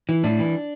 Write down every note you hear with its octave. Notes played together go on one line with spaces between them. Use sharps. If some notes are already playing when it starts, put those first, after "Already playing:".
E3
A2 D4
E3